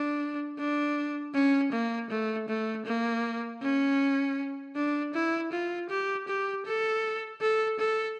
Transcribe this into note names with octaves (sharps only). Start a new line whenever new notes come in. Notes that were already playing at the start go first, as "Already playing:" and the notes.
Already playing: D4
D4
C#4
A#3
A3
A3
A#3
C#4
D4
E4
F4
G4
G4
A4
A4
A4